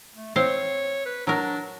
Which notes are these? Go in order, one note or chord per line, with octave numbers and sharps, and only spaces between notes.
A3
C4 C5 C#5 F5
B4
F#3 D4 A#4